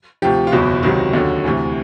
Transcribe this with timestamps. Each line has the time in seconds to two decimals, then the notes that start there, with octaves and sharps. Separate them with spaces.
0.22 D2 C3 F3 G4
0.47 F4
0.52 F#1 E2 B2 F#3 F#4
0.83 C#2 C3 D#3 F#3 F#4
1.13 D#2 D3 F#3
1.44 D2 C3 E3